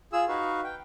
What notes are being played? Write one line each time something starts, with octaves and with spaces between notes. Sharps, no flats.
F4 G#4 E6
D#4 F#4 B4 F5
G5